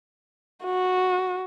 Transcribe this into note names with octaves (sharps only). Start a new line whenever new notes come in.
F#4